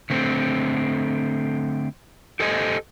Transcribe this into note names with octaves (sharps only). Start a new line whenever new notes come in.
D3 A3 C4
G4 A4 C5 D#5 G#5